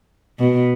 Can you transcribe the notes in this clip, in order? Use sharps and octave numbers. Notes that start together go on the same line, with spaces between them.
B2